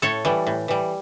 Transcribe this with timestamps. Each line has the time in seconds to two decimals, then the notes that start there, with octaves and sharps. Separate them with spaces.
0.02 A2 A4 C#5
0.25 E3 G3
0.47 A2
0.68 E3 G3